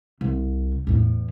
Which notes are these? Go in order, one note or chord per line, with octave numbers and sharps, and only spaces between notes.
C2
E2 A2